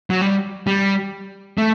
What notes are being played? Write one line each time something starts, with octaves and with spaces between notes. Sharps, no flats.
F#3
G3
G3
A3